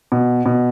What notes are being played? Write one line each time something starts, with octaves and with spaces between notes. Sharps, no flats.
B2
B2